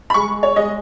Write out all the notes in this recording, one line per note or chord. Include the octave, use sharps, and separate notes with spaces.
B5
G#3 C#6
C#5
G#3 D#5